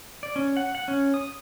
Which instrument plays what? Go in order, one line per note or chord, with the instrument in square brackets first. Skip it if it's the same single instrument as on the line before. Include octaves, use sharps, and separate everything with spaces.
[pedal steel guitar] D5
C#4
F#5
F#5
C#4
D#6